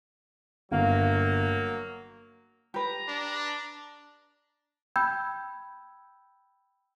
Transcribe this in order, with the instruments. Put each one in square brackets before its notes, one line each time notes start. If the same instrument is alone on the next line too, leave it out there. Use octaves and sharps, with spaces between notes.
[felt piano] G1 F5 [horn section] F#3 A#3
[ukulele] G4 B4 [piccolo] A#5
[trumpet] D4
[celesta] G5 B5 E6 G6 G#6